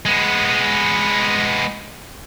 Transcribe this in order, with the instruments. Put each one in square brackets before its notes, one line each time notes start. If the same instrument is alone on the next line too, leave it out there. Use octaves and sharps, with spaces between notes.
[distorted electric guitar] G#3 B3